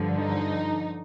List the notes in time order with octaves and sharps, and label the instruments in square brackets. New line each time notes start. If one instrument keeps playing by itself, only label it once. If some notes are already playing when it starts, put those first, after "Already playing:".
Already playing: [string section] G2 D3 F3
D#4